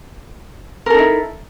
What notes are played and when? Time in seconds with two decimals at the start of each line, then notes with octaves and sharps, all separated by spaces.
0.86 A#4
0.90 A4
0.94 D#4
0.98 E4